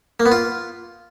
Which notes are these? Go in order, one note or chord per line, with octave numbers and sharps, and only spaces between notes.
A#3
B3
F4